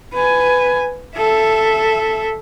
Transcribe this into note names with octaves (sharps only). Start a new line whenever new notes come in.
B4 G#5
A4 E5